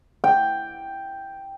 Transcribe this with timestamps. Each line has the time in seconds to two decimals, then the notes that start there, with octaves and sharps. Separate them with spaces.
0.24 G5